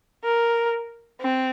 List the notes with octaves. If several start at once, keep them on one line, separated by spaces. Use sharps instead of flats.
A#4
C4